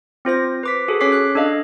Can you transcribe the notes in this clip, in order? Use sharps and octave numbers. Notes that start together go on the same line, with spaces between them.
C4 F4 C5 A#6
B4 D6 B6
F#4 G#4 A4
C#4 C#5 D6 B6 C7
F#6
D4 A4 D#5 F5